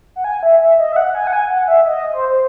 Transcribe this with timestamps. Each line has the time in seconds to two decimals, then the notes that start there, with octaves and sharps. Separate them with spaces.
0.16 F#5
0.24 G#5
0.43 E5
0.61 E5
0.79 D#5
0.92 E5
0.96 F#5
1.15 G#5
1.27 F#5
1.33 G#5
1.50 F#5
1.68 E5
1.86 D#5
2.14 C5
2.29 C5